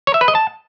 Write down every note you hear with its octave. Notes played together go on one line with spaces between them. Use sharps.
C#5
E5
B4
D#5
A5